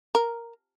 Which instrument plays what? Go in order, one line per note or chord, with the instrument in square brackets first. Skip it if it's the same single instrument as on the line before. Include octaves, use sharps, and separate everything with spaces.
[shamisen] A#4